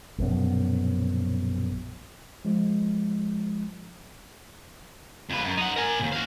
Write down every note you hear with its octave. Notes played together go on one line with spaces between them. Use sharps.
A#1 F#2 B2
F3 G#3
F2 B4
F#2
D#4 F#5
A#4 G#5
D#2 B2
F#4 F5